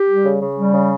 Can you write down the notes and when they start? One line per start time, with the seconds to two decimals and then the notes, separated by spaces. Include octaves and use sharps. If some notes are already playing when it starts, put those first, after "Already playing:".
Already playing: G4
0.08 G3
0.24 C#3
0.40 C#3
0.57 G3
0.73 C#3